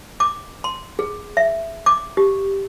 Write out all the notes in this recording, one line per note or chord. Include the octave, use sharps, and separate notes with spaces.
D6
C6
G#4
E5
D6
G4